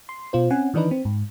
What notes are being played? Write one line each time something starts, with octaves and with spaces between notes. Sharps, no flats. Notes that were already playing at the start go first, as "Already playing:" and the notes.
C6
B2 F4 C5
C4 C#4 F#5 G#5
D#3 E3 D4 D#4 B4
C4
G#2